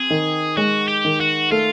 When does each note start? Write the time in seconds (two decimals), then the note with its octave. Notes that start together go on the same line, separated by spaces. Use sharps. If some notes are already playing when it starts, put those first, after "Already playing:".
Already playing: C4 G#4
0.10 D#3
0.57 G#3 F#4
0.88 G4
1.05 D#3
1.21 F#4
1.51 A3 F4